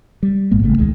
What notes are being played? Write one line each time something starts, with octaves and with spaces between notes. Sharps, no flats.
G3
A#1 G#2 G#3 A#3
G#1 C#3 A3
D#1 C2 D#3 G#3